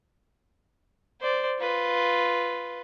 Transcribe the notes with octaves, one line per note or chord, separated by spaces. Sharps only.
C5 D5
F4 B4